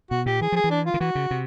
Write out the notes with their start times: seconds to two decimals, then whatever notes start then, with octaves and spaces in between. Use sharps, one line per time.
0.11 B2 F#4
0.26 A#2 G4
0.41 E3 G#4
0.52 F3 G#4
0.64 E3
0.70 D4
0.86 F4
0.94 D#3
1.00 E3 F#4
1.15 C#3
1.31 C3